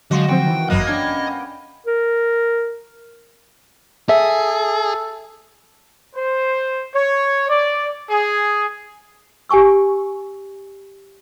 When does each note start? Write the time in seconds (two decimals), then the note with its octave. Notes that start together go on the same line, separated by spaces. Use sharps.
0.11 D3 F3 F#3 G#3 F#4 D#5 F5 C6
0.29 F3 C4 C5 G5
0.46 D#3 E3
0.70 G1 F#2 F#3 A#3 B3 D#5 A#5 F#6
0.87 C#4 D4 G5 G#6
1.87 A#4
4.09 G#4 A4 E5
6.16 C5
6.94 C#5
7.49 D5
8.09 G#4
9.49 G4 G#5 A5 C#6 E6